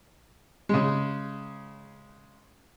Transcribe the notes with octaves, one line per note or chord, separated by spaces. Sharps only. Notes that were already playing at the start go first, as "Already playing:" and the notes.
C#3 G#3